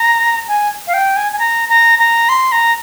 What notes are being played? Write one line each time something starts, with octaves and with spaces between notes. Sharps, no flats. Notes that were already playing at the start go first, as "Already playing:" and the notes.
Already playing: A#5
G#5
F5
G5
G#5
G#5
A#5
A#5
A#5
C6
A#5